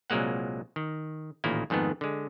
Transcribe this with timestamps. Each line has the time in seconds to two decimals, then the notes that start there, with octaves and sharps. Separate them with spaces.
0.10 C2 A#2 F#3 G#3 A#3 F#5
0.76 D#3
1.44 A1 A#2 D#3 A#3 E4
1.70 F2 G#2 D#3 A3 B3
2.01 D3 G#3